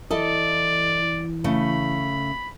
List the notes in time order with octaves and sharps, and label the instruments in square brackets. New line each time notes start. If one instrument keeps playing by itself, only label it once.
[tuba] E3 [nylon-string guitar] E4 A4 D#5 [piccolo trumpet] D5
[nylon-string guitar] C#3 A3 [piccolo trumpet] B5